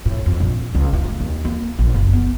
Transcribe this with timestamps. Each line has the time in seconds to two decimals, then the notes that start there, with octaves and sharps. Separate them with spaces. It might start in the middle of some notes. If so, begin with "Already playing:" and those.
0.06 A2
0.26 F2
0.40 A#1
0.75 C#2
0.93 E4
1.05 A3
1.20 D#2
1.45 A#3
1.79 A#1
1.94 F#1
2.13 B3